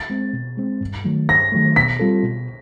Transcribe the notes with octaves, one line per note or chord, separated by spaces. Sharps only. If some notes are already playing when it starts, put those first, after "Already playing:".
Already playing: A6
G#3 C4
B2
G#3 C4
G2
D#3 F#3 A3
G2 A#6
D#3 F#3 A3
B2 B6
G3 C4 F4 A4
B2